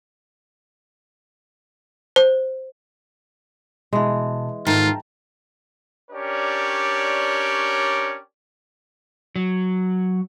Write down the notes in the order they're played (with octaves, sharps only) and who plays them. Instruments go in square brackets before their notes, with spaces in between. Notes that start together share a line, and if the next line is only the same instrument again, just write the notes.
[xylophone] C5
[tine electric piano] B2 A5 [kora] E3 G#3
[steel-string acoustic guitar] G#2 D#3 A3 [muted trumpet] F4 [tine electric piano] G5 A5 A#5
[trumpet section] C#4 D4 G4 A#4 C#5 D5
[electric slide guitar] F#3